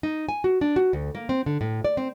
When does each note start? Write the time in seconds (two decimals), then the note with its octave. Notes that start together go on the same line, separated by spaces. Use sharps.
0.03 D#4
0.29 G#5
0.44 F#4
0.61 D4
0.76 F#4
0.93 D2
1.15 A#3
1.29 C4
1.46 D3
1.61 A2
1.85 D5
1.97 C4